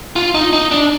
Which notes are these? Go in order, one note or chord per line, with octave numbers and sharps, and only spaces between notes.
F4
D#4
D#4
D4